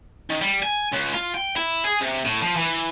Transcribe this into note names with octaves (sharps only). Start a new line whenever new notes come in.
D#3
G3
G#5
C#2
F4
G5
E4
G#4
C3
A2
F3
E3